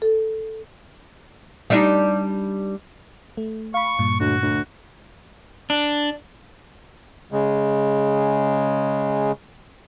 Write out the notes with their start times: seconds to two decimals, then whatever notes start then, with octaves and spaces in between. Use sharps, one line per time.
0.02 A4
1.70 G3 D4 D#4
3.37 A3
3.74 F5 B5 C#6
3.99 G2 A#2
4.20 D2 F#4
4.42 D2
5.70 D4
7.32 C#3 G#3